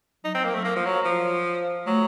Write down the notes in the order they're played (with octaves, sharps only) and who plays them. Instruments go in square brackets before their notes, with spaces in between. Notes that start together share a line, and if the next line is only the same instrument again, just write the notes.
[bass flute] F#3 [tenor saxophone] D#4
[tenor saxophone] C4
A#3
A3
A#3
F3
F#3
F3
[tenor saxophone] F#3 [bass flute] A3